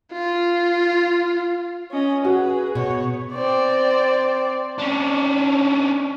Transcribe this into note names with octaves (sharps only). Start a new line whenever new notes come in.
F4
C#4 D#5
F#4 G#4 B4
B2 C#5
C4 D5
C#4 D4